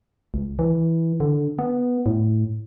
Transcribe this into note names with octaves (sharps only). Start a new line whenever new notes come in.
C#2
E3
D3
B3
A2